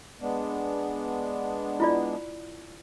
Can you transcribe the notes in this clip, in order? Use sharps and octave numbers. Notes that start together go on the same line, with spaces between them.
G#3 B3 D4
E4 F4 D5